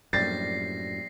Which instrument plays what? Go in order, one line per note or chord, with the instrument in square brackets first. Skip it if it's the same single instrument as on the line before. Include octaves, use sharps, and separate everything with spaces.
[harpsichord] A#1 G3 G4 [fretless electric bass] F#2 A2 [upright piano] A6 [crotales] A#6 C7